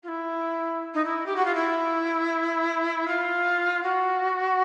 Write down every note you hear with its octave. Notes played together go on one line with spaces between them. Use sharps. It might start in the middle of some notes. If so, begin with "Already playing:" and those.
F4
E4
D#4
E4
G4
F#4
F4
E4
F4
F#4